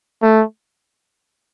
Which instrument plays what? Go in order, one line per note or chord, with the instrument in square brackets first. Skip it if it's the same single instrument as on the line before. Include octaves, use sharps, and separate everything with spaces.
[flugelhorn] A3